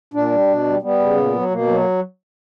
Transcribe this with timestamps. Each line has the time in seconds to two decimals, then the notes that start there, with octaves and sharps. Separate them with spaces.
0.14 A#2 D4
0.31 G3
0.47 B2
0.65 G3
0.82 G3 B3
0.99 C#3
1.17 A#2
1.33 F#3
1.50 B2 A#3
1.67 F#3
1.80 A#3